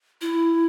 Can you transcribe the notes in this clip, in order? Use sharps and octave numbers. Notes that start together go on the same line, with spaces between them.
E4